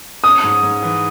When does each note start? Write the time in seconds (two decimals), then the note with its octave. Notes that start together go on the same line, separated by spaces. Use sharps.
0.24 C#4 D#6
0.43 G#2
0.63 G#2
0.82 E3